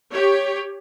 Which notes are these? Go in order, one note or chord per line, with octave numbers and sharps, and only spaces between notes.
G4 C#5